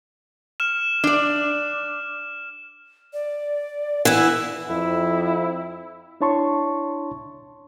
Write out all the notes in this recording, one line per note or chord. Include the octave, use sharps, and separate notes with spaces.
F6 E7
D4 D5
D5
E3 E4 F#5
F2 E4
D4 E4 C#5 A5 C6 C#6